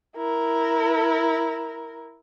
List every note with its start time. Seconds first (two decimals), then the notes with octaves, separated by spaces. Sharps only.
0.17 E4 A#4